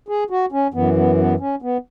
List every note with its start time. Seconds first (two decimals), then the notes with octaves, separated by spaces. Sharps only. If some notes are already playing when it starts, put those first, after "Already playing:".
0.08 G#4
0.30 F#4
0.52 C#4
0.74 F#2 E3 B3
0.96 B3
1.18 B3
1.40 C#4
1.62 B3